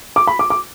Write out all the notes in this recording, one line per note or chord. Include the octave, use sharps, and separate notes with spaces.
D6
B5
D6
D6